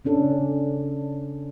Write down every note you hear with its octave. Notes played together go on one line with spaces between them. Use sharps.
C#3 C#4 D4 A4